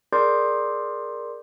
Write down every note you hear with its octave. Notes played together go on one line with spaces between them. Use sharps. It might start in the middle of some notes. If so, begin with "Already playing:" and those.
G#4 A#4 D5 C6 D6 G6